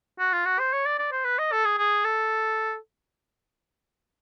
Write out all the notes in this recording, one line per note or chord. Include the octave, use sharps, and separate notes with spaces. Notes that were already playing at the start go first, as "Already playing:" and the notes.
F#4
F4
F#4
C5
C#5
D5
D5
C5
B4
D#5
A4
G#4
G#4
A4